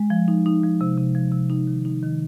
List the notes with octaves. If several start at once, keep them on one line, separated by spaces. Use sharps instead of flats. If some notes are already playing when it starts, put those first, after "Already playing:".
Already playing: G#3
F3
D#4
D#4
F3
C3
C3
F3
C3
D#4
D#3
D#4
D#3